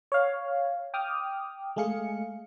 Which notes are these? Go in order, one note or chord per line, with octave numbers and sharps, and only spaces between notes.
C#5 F5
G5 D6 D#6 F6
G#3 A3 G#4 F5 C#7